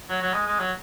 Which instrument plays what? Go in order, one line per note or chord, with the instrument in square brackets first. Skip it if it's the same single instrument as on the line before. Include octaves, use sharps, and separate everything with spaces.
[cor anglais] F#3
F#3
G#3
G#3
F#3